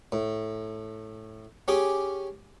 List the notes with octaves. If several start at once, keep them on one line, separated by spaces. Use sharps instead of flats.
A2
C#4 G4 G#4 D6